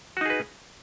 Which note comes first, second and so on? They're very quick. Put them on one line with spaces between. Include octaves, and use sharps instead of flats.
F#4 D#4 G#4 B4